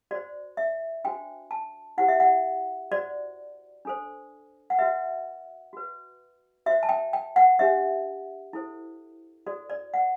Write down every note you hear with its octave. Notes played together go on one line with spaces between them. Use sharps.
F#4 C5 D5
E5
D4 F#4 C5 G5
A5
E4 G4 C5 F#5
E5
F#5
F#4 C5 D5
D4 A4 C5
F#5
F#4 B4 E5
F#4 B4
F#4 C5 E5
A5
G5
G5
F#5
D4 G4 C5 E5
E4 A4 C5
F#4 A4 C5 D5
D5
F#5